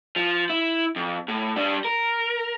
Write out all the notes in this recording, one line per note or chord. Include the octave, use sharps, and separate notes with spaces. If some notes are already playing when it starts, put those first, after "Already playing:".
F3
E4
F2
A2
G3 D4
A#4